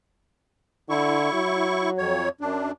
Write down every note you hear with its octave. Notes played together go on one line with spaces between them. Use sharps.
D3 E4 C#6
F#3
F2 C#5
F#2 D4